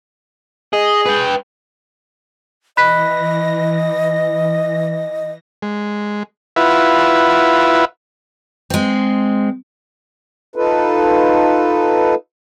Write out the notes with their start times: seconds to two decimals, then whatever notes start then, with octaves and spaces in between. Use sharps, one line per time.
0.73 G#4 D#5
1.06 B4 G5
2.77 E3 D#5 B5 F#6 A#6 B6
5.62 G#3
6.56 E4 F4 B4 E5 F#5
8.70 G#3 C4
10.56 D#4 F4 A4 B4